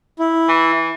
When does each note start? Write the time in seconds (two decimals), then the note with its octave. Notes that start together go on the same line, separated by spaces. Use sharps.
0.19 E4
0.49 E3